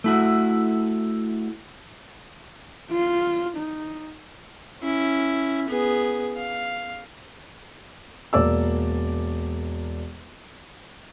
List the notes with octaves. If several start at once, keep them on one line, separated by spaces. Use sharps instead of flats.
A3 E4 F#4
F4
D#4
C#4 E4
B3 G#4
F5
E1 A#3 D5 E6